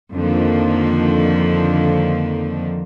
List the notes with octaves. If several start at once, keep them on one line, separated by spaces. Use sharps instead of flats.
F2 D3 D#3 F3 A#3